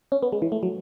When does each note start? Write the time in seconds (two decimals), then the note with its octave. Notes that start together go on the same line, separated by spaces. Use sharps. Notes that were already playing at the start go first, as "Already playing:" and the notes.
0.12 C#4
0.23 B3
0.32 G#3
0.42 E3
0.52 A3
0.63 F#3